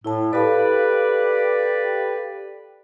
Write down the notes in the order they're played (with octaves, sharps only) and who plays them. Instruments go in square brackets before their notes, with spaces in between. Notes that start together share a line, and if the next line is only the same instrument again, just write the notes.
[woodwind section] A2 [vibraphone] E4 A5
[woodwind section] G4 B4 D5 [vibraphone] A4 F5 B5